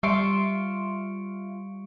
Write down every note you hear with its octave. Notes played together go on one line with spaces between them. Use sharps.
G3 F4 E5 C6 C#6 C#7 D7